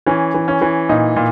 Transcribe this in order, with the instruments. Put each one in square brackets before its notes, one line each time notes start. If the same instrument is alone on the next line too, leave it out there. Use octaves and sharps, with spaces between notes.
[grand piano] E3 C#4
E3
C#4
E3
A#2 D#4
A#2